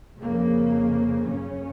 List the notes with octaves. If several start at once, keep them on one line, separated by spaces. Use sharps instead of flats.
F2 C#3 A#3
F#2 C#3 C#4